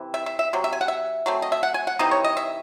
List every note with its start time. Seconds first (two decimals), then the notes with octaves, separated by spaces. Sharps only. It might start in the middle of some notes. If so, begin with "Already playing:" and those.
Already playing: C3 E3 C4
0.14 E5
0.26 E5
0.39 E5
0.53 C3 F#3
0.64 E5
0.73 G#5
0.81 F#5
0.88 E5
1.26 F#3 A3 C4
1.42 D#5
1.52 E5
1.63 F#5
1.74 G#5
1.87 F#5
1.99 C3 E3 C4 D#4 D#5
2.11 C#5
2.24 D#5
2.37 E5